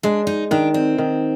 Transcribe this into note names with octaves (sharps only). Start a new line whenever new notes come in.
G#3 D4
D#4
D#3 D4
C4
D#3